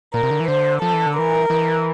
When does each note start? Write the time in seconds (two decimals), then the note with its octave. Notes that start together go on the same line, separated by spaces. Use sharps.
0.14 A#2 A#4
0.23 C3
0.31 D3
0.40 E3
0.48 D3 C5
0.82 F3 A4
0.94 E3
1.06 D3
1.17 E3 A#4
1.50 E3